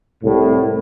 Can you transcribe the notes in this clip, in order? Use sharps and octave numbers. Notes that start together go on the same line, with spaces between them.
C2 A2